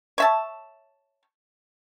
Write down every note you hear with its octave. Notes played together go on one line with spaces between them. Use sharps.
C#5 E5 A5